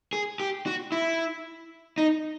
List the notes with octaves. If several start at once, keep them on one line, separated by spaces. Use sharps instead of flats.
G#4
G4
F#4
E4
D#4